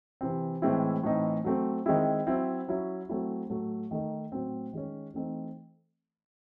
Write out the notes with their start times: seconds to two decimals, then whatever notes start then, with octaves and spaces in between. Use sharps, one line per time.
0.21 C3 E3 C4
0.62 A2 E3 G#3 C4 E4
1.03 A2 E3 C4 D#4
1.44 F#3 A3 C4
1.86 D#3 G#3 C4 E4
2.27 F#3 C4 E4
2.68 F#3 C#4 E4
3.09 F#3 A3 C4 E4
3.50 A2 F#3 A3
3.91 D#3 A3 D#4
4.32 A2 F#3 C4
4.73 D#3 G#3 C#4
5.14 E3 A3 C4 D#4